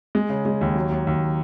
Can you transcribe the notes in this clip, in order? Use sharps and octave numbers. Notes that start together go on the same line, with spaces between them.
G#3
C#3
G#3
D#2
F#3
D#2
D#2